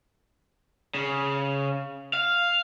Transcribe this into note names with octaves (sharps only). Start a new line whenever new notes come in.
C#3
F5